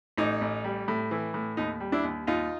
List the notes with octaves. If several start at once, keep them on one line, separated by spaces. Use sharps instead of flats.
A1 D#4
A1
G3
A2
E3
A2
D#2 D#4
G3
D4 E4
D#2
D#2 D#4 F4